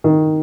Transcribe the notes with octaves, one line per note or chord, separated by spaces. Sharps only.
D#3